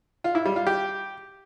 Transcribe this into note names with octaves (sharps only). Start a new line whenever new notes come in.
F4
E4
G3
F4
G4